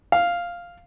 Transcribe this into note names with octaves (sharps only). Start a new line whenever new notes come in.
F5